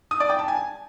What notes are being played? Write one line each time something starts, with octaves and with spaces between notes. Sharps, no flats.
D#6
D5
G5
A5
G#5